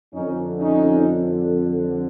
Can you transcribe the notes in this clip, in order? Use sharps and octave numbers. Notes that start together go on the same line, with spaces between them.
F2 D3 C#4 D#4
C#4 D#4